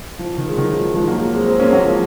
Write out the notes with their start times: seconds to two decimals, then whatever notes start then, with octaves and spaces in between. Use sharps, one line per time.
0.19 F3
0.38 D#3
0.48 G#3
0.57 D#3 F#3
0.70 F3
0.82 D#3
0.96 F3 G#3
1.08 F#3 A#3
1.34 G#3 C4
1.46 G#3 C4
1.59 A#3 C#4
1.73 F#3 A#3
1.85 F3 G#3